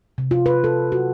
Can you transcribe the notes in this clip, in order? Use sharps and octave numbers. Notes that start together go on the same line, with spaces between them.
C3
F4
B4
A4
F#4